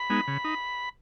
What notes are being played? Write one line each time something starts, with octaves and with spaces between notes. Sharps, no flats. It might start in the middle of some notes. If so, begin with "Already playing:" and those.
Already playing: B5
G#3 B3 D#4
C#3
D#4